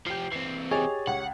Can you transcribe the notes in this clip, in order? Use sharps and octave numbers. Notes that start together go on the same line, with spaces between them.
F3 G4 G6 C7
E3 C4 C7
G4 G#4 C#5 D#5 A6 F7
C#2 F#5